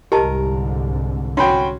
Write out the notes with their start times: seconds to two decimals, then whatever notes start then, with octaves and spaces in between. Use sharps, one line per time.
0.12 C2 G#2 D3 G4 A#4 D#5 A5
1.37 C#4 F#4 G5 B5 C6